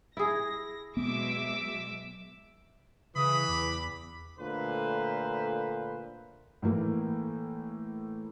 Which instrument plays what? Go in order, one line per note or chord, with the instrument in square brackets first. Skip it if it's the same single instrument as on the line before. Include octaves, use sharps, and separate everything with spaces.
[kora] E4 G#4 [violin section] A#6
[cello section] B2 F#3 G#3 [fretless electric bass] B3 [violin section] E5 D6 E6
[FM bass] C#3 [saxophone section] E3 [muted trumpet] B5 [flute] D#6
[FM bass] E2 [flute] D6
[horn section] A#2 D3 A3 B4 C5
[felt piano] A2 E3 A#3